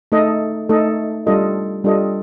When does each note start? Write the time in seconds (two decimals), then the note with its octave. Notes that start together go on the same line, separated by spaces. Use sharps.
0.12 A3 D#4 A4 D#5
0.69 A3 D#4 A4 D#5
1.27 G3 D4 F4 A4 D#5
1.84 G3 D4 F4 A4 D#5